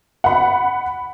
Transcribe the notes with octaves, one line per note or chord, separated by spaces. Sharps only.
F#5 B5